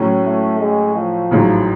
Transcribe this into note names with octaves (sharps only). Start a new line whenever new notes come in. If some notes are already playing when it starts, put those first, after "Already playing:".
Already playing: A2 F#3 C#4
A3
G#3
F3
A1 G#2 F#3